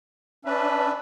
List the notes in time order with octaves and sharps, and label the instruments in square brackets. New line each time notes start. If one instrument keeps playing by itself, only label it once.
[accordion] C#4 D4 B4 [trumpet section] E5 A5 B5